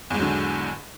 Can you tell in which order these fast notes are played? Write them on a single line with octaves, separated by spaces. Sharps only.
E2 G#2 F#3 D3